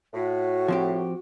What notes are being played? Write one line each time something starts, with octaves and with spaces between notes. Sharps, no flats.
A2 F#4
F3 C4 G4